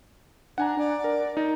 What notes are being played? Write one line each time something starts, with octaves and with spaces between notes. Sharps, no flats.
D4 F#5 G#5 A#5
D5
A#4
D#4